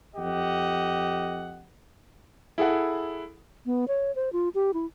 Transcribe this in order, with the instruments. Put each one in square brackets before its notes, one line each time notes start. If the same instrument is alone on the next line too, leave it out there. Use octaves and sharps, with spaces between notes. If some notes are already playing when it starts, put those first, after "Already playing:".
[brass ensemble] F2 G4 D#5 F#5
[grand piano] E4 G#4 A4 F#5
[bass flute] B3
C#5
C5
F4
G4
E4